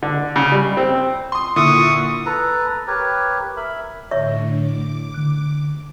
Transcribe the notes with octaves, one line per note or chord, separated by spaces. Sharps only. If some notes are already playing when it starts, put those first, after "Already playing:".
D3
C#3
G3
C4
C6 D#6
A#2 D3 E4 C#6 D#6
A4 B4 A#5
G4 A#4 B4 C#5
A#4 E5 B5
A2 D3 C#5 E5 C#6
D6
D3 F#6